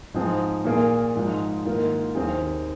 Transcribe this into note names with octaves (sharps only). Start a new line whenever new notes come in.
G#2 F3 C4 G#4
A#2 A#3 G#4
G#2 F3 G#3 F4
G#2 D#3 A#3 F4 A#4
D#2 D#3 C4 G#4